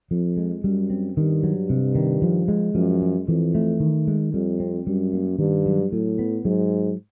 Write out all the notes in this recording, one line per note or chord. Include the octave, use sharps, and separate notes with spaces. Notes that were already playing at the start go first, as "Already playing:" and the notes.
F2 F3
G#3
F#2 G3
C4
G2 D#3
F#3
C3
D#3
F3
G#3
F#2 F3
G#3
F2 E3
A3
D#3
G#3
F2 G3
C4
F#2 G3
A#3
G2 D#3
F#3
A2 F#3
B3
G#2 F#3